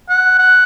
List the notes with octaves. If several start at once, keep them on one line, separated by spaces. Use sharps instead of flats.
F#5
F#5